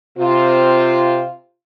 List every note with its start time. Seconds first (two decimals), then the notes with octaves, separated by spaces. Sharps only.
0.19 C3 C4 F4